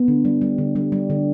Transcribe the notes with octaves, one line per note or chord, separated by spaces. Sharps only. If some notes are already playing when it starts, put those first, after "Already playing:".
Already playing: B3
D3
G3
G3
D3
G3
G3
D3